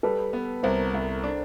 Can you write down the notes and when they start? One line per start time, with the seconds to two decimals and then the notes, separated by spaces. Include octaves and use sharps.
0.03 G3 A4 B4
0.33 B3
0.63 C2 A#4 C5
0.94 C2
1.23 D4